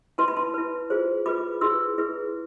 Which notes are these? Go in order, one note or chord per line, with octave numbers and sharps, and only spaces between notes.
E4 B4 A5 C6
B5
A5 C6
E4 B4
F4 G#4 C5
F4 G#4 B4 B5 D6
E4 G#4 B4 C6 E6
E4 G#4 B4